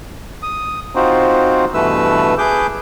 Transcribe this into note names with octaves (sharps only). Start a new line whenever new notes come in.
D#6
C4 D#4 F4 F#4 C5
G2 B2 E3 A3 B4 E6
G#4 B4 D6 G6